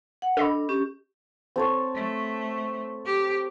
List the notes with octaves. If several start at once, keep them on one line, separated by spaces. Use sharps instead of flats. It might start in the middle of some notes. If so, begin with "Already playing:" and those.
F#5
D4 A4 D#5 B5
C#4 G4
C4 A4 C#5
A3
G4